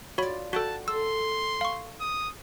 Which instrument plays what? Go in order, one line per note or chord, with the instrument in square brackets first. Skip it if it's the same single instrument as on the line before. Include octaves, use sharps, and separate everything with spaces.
[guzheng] F4 D5 [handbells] F#4 C#5 B5
[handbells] F#4 A4 [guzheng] F#5 G5 [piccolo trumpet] A5
[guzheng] A4 [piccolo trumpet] C6 [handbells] E6
[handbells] F5 C#6
[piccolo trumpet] D#6